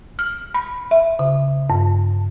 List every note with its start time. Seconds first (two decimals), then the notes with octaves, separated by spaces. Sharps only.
0.19 F6
0.54 B5
0.91 E5
1.19 C#3
1.70 G2